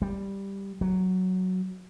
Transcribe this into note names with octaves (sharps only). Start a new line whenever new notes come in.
G3
F#3